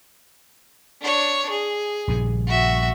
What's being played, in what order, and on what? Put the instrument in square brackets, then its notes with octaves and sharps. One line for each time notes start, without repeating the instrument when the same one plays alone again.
[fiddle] D4 C#5
G#4
[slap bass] A#1 G2 C#3
[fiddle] F#4 E5